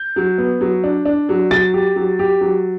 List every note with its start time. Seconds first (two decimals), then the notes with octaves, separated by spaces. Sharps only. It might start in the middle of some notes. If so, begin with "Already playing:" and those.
Already playing: G6
0.16 F#3
0.38 B3
0.61 F#3
0.84 D4
1.05 D4
1.29 F#3
1.51 F#3 A6
1.74 G4
1.96 F#3
2.19 G4
2.41 F#3